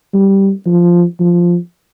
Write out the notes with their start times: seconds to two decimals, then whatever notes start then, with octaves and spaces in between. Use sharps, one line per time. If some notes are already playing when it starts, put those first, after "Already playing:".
0.14 G3
0.66 F3
1.20 F3